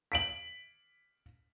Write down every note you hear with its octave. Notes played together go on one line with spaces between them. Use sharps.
B6 D7 F#7